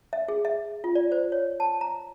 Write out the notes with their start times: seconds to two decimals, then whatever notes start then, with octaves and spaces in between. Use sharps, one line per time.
0.13 E5
0.28 G#4
0.45 E5
0.84 F4
0.95 D5
1.12 C5
1.32 C#5
1.60 A5
1.81 A#5